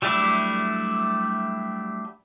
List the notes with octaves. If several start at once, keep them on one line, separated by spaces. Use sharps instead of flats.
F#3 G3 A3 D4 E4